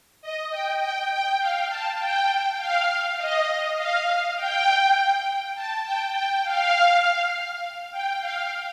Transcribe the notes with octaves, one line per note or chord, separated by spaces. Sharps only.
D#5
G5
G5
G5
F5
A5
G5
F5
D#5
F5
G5
A5
G5
G5
F5
G5
F5